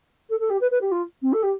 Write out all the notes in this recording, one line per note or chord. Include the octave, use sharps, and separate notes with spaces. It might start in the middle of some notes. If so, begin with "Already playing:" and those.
A4
A4
G4
B4
B4
G4
F4
C4
A4
G4